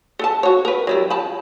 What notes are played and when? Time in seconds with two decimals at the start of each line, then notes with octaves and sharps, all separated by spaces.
0.19 A4 B4 A5
0.43 F#4 C#5
0.65 A#4 B4
0.87 F#3 G3 E4
1.10 F3 A5 B5